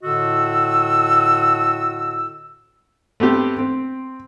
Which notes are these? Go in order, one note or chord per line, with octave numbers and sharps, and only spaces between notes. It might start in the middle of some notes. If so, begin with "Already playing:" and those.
A2 D3 F#4 D#5 E6
A3 B3 C4 G4
C4